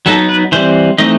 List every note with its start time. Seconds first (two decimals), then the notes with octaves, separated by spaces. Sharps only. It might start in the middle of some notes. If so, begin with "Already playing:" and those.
0.06 F#3 B3 D#4 A4
0.29 B4
0.52 E3 G3 C4 C5
0.98 E3 A3 C4 D#4 D#5